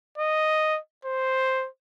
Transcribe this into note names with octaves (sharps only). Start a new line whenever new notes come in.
D#5
C5